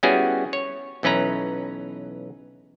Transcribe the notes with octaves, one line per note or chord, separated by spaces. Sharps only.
G3 B3 C#4 E4 F#4 G#4
C#5
B1 E3 C#4 B4 A#5